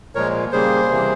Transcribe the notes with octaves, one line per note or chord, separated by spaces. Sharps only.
A#2 F3 G#3 A#4 C#5
C#3 G3 A#3 G#4 C5
C3 E3 G3 A#3